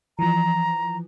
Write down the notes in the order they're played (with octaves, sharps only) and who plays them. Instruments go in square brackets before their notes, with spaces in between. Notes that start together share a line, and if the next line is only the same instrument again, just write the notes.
[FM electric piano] E3 F3 [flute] A#5